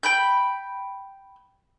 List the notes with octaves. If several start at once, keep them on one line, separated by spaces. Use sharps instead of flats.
G5 B5 G6